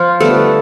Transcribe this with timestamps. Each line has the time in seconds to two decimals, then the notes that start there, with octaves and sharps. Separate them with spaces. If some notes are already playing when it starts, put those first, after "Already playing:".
Already playing: F3 F4
0.20 D3 G3 A3 B3 A4